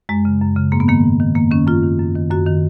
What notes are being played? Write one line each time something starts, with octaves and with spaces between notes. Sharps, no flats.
F#2 G#3
C#3
F#2
C#3
G#2 A#3
B3
D#3 A#3
G#2
D#3
F#2 A#3
D#3 C#4
F#2 F4
D#3
F#2
D#3
F#2 F#4
D#3